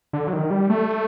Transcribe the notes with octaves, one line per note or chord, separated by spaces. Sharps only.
D3
F#3
D#3
G3
A3